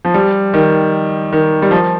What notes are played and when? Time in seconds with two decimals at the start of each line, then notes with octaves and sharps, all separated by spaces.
0.05 F3
0.14 G3
0.54 D#3
1.32 D#3
1.62 G3
1.71 F3